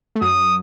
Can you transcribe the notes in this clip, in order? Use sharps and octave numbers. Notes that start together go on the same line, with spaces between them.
A3
F#2 F#3 D#6